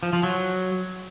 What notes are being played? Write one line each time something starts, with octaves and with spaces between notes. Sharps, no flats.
F3
F3
F#3